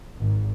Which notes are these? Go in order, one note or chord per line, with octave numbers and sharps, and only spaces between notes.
G#1